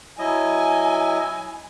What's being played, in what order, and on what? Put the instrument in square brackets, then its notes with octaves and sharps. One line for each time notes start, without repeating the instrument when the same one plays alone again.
[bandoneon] F#3 E4 D#5 [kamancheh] G#5